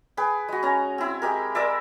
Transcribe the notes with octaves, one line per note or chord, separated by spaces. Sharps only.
G#4 B4 G5
G#3 F#4
C#4 A#5
C4 E4
G#3 G4 A#4
A#4 C5 D5 E5